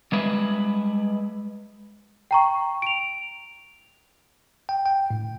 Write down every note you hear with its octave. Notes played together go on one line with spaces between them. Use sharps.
G3 G#3 B4 E5
G5 A#5 C#6
D7 F7
G5
G5
A2